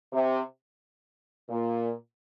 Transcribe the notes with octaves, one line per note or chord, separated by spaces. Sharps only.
C3
A#2